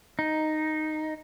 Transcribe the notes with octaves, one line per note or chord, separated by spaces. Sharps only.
D#4